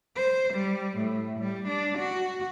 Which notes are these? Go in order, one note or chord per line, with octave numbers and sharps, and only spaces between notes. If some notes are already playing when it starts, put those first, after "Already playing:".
C5
G3
A2
G3
D4
F#4